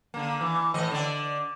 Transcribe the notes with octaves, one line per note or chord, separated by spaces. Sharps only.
D3 A#3
E3
A2 E3 D#5
D3 D5